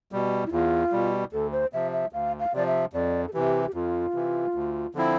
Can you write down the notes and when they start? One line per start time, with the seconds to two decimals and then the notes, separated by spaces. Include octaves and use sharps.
0.12 B2 G3
0.46 E4
0.52 E2 F4
0.92 B2 G3
1.33 D2 A4
1.52 C5
1.73 C3 F3 E5
1.93 E5
2.13 D2 F5
2.40 F5
2.53 C3 F3 D5
2.66 E5
2.93 F2 D5
3.28 A4
3.33 C3 E3 G4
3.67 G4
3.74 F2 F4
4.14 C3 E3
4.54 D2
4.95 D3 F3 C4 E4